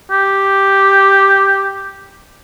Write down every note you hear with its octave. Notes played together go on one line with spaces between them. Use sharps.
G4